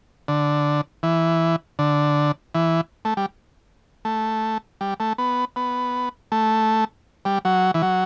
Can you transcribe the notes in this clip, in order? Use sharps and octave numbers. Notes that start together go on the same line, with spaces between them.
D3
E3
D3
E3
A3
G3
A3
G3
A3
B3
B3
A3
G3
F#3
E3
F#3